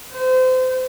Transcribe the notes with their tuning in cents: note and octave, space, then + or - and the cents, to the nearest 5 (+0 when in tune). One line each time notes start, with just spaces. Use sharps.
C5 -30